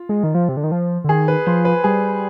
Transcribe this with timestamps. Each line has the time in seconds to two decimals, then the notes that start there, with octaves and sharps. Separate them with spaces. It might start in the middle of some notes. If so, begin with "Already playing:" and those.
Already playing: F4
0.09 G#3
0.23 D#3
0.34 F3
0.49 C3
0.57 D3
0.64 D#3
0.72 F3
1.04 D3
1.09 D#3 G#4
1.28 B4
1.46 F3 C5
1.65 B4
1.84 G3 G#4